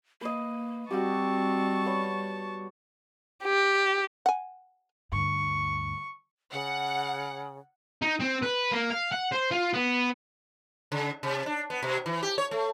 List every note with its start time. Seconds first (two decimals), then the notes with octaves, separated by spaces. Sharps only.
0.21 A#3 B4 D#5
0.91 G3 C4 F#4 G4 A5 C#6
1.86 B3 C#5
3.44 G4
4.26 F#5 G#5
5.12 D2 G2 C#6
6.53 C#3 F#5
8.02 D#4
8.21 C4
8.43 B4
8.72 A#3
8.90 F5
9.12 F#5
9.32 C5
9.51 F4
9.74 B3
10.92 C#3
11.23 C3
11.46 D4
11.70 B3
11.83 B2
12.06 E3
12.23 G4
12.38 C#5
12.51 A3